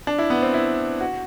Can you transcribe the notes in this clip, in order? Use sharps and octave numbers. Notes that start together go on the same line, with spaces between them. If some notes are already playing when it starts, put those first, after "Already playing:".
D4
E4
B3
C4
E4
F#4